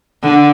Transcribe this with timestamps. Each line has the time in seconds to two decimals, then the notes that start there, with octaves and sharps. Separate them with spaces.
0.23 D3